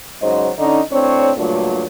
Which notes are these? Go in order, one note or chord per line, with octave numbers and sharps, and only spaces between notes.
G#2 C#3 F#3 C5 D#5
D3 C#4 D#4
A2 C4 D4 C#5
G2 A#2 D3 F#3 A3